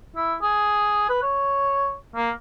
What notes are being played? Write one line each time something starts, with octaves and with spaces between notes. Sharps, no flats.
E4
G#4
B4
C#5
A#3